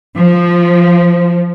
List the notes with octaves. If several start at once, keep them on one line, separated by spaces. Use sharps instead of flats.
F3